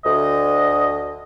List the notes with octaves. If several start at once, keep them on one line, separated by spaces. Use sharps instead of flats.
D2 D#5